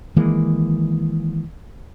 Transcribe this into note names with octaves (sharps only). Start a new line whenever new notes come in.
D#3 E3 G#3 A#3